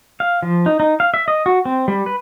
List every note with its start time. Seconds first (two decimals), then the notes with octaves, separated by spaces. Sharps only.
0.20 F5
0.43 F3
0.66 D#4
0.80 D#4
1.00 F5
1.14 E5
1.28 D#5
1.46 F#4
1.65 C4
1.88 G3
2.06 B4